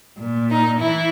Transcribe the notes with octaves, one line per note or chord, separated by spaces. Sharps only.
A#2
D#4
E3 E4